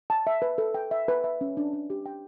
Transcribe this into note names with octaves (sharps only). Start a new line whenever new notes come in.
A5
E5
B4
A4
G5
E5
B4
E5
C#4
D4
D4
G4
G5